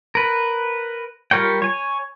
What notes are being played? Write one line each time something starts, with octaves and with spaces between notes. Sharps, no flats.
A#4 B4
G3 F4 A#4 C#5 G5
C#5 G#5